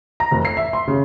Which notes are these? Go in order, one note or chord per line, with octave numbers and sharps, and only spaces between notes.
A#5
F1
C7
E5
C6
C#3